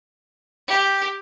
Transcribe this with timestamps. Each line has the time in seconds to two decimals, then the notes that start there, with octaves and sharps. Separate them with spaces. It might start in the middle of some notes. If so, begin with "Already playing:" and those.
0.68 G4